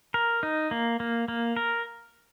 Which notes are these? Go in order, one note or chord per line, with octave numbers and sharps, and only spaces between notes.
A#4
D#4
A#3
A#3
A#3
A#4